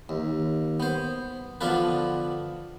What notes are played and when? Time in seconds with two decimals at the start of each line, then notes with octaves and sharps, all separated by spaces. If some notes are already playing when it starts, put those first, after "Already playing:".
0.09 D#2
0.80 B3 C5
1.61 D3 F3 B3 D4 F4 B4